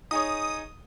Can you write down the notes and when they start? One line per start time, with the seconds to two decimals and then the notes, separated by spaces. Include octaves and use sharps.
0.11 D#4 G#4 C#5 D#6